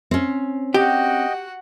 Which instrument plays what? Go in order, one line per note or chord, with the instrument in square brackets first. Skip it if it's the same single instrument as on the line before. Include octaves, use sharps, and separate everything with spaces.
[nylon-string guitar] C4 C#4
[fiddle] F#4 F#5 [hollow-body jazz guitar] G4 [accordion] D#5 G5